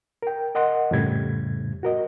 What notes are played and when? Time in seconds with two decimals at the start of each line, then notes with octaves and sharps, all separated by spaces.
0.22 A#4 G5
0.55 A#4 D#5 F#5 C6
0.91 F2 A2 C#3 G3 G#6
1.83 F#4 A#4 D#5